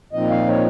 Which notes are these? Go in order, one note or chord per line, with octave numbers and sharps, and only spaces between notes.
A#2 F3 C4 D#4 D#5
F5
C#5